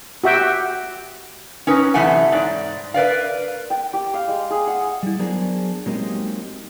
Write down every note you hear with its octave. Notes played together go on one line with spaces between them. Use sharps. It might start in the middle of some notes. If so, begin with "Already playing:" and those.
F#4 G4 E5 G5
C#4 D#4 B4
F#2 C3 E3 A3 F#5 G#5
G#2 D5
A#4 B4 D5 F5
G5
G4
F5
G#3
G#4
F#5
G3 E4
F#3 B3 D4 G#4 A#4 C5
F#3 G#3 A#3 C4 D#4 G4